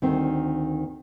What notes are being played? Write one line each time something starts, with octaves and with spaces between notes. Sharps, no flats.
D2 D#3 C4